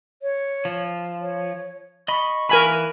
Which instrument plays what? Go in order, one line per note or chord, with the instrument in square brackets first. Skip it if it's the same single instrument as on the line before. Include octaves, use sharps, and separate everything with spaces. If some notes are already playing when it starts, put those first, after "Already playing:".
[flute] C#5
[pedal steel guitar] F3
[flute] C#5
[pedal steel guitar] D#5 B5 [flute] C#6
[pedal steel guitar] E3 [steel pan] A#4 G#5 B5